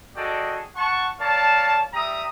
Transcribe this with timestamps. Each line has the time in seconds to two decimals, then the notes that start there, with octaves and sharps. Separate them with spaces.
0.16 F#4 G#4 A4 D5 D#5 G5
0.76 F#5 A5 C#6
1.20 A#4 C#5 D5 F5 A5
1.94 G3 E5 G5 A#5 D#6